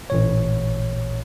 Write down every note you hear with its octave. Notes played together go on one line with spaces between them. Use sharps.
A1 A#2 C#5